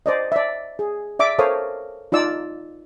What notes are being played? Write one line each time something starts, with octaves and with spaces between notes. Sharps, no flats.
C5 D5 D#5
D5 E5
G#4
D5 E5 D6
A4 A#4 C5 C#5 F5 D#6
D#4 F4 D5 E6